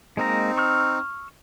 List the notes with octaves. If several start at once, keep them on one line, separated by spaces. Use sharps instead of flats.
G#3 A#3 C4 D#4 A#5
C#6 E6 F6